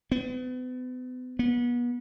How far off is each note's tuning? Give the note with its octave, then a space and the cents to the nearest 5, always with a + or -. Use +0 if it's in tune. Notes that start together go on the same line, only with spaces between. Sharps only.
B3 +40
B3 -35